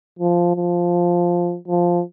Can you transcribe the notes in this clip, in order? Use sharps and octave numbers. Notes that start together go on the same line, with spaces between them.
F3
F3
F3